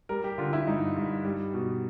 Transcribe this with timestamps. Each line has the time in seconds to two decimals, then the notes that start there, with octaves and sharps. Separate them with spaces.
0.09 G3 A#4
0.24 G4
0.38 D3 F4
0.53 E4
0.67 G2 D#4
0.96 G2
1.25 G3
1.54 B2